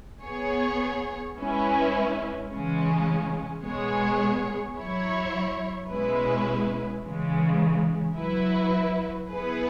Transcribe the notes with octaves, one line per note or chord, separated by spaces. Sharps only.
B3 G#4 C#5
G#3 C#4 E4 B4
C#3 E3 G#3 C#4
B2 G#3 B3 G#4 C#5
F#3 E4 C#5
B2 G#3 C#4 E4 B4
C#3 E3 G#3
F#3 E4 B4
B3 E4 G#4 B4